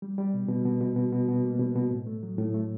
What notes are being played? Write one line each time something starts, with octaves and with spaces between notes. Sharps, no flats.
G3
G3
B2
B2
B2
B2
B2
B2
B2
A#3
B2
B2
A2
A3
F#3
A2
A3